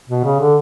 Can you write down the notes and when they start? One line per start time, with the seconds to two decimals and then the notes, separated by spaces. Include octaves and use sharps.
0.09 B2
0.24 C#3
0.39 D3